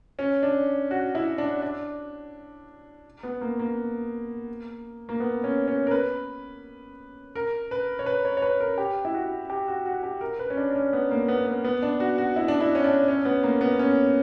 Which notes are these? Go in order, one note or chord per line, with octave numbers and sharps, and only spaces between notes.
C#4
D4
F#4
E4
D4
D4
B3
A#3
A#3
A#3
B3
C#4
C#4
A#4
B4
A#4
B4
C#5
B4
C#5
C#5
B4
A#4
G4
E4
F#4
G4
F#4
F#4
G4
A#4
B4
C#4
D4
D4
C#4
B3
A#3
B3
B3
B3
D4
F#4
F#4
E4
D4
E4
C#4
D4
C#4
B3
A#3
B3
C#4